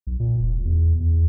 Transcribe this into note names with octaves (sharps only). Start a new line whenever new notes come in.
B1
A#2
E1
E2
E2